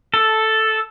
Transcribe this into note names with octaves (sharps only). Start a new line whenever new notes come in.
A4